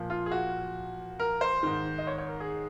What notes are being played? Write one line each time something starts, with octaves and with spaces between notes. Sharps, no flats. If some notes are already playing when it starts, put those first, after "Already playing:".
Already playing: A#2 F3
F4
G#4
F#4
A#4
C5
G#2 D#3
D#5
C#5
C#5
A#4
G#4